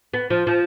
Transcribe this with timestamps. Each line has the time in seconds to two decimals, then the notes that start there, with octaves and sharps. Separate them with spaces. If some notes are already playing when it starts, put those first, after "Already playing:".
0.14 B3
0.30 F3
0.47 F3